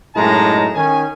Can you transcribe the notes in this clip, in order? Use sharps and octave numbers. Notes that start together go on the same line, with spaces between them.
F#2 A2 G#3 D#4 A5 A#5
D#3 C#4 G#5